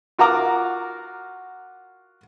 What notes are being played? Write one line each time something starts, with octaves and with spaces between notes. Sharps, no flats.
F4 F#4 A#4 A#5 D6